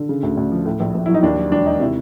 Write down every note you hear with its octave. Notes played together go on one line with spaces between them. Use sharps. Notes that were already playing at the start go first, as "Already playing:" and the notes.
Already playing: D3
C#3
D2
D2
F3
A2
A#1
A#1
F#3 E4
D#4
D#2 D4
F#3
E1 D4
D#3 D#4
C3 E4